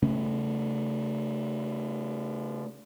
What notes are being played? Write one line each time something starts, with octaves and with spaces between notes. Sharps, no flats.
C#3 A3 C#4